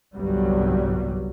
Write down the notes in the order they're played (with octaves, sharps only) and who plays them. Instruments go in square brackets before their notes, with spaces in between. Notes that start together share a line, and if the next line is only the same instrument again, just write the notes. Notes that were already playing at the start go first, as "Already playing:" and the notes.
[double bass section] G1 C2 G2 F#3 G3